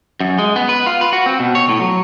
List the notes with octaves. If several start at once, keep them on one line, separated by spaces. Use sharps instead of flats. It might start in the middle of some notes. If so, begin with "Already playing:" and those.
F#2
G#3
B3
B4
F4
B4
F#4
C4
B2
C#5
A2
F#3